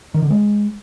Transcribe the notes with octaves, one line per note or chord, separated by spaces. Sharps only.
D#3
D3
G#3